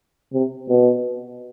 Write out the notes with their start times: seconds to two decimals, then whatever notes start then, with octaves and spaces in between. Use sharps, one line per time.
0.33 C3
0.69 B2